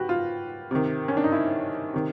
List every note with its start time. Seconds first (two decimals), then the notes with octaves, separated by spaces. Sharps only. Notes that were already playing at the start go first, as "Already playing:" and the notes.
Already playing: F#4 G4 B4
0.09 F4
0.71 C3 D#3
1.08 C#4
1.17 D4
1.24 D#4
1.32 E4
1.93 C3 D#3